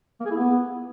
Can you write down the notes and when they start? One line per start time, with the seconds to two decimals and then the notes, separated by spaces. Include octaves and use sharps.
0.21 A#3
0.26 G#4
0.31 E4
0.36 B3